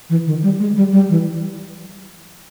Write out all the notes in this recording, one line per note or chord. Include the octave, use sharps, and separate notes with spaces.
E3
D#3
G3
G#3
G3
G3
E3